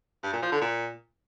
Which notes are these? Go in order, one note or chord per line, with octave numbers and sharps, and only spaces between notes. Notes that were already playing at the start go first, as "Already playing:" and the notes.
G2
A#2
F3
D3
A#2